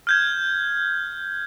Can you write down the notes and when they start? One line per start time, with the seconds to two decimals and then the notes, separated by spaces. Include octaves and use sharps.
0.07 F6 G6 G#6